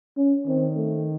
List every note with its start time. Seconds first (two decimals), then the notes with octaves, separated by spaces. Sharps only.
0.17 C#4
0.46 D#3 C4
0.76 A3